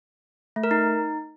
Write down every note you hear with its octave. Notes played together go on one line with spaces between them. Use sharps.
A3
A#4
D#4